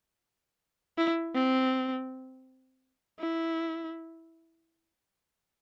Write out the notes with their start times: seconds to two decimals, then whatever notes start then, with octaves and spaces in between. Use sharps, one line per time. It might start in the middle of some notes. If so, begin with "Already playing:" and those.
0.98 E4
1.35 C4
3.20 E4